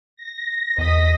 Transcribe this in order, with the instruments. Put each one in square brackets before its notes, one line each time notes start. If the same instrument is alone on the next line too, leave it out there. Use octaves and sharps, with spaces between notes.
[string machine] A#6
[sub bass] E2 [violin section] D#5 D#6 B6